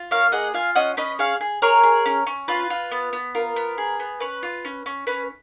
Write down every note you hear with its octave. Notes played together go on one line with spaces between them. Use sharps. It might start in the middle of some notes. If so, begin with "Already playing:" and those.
Already playing: F4
A#3 C#5 F5
G#4 D#5 F#5
F4 F5 G#5
C#4 D#5 F#5
C#4 B4 D#5
G#4 C#5 F5
G#4
G#4 A#4 C#5
G#4
C#4
C#4
F4 B4
F4
B3
B3
F4 A#4
B3
G#4
B3
C#4 B4
F4
C#4
C#4
C#4 B4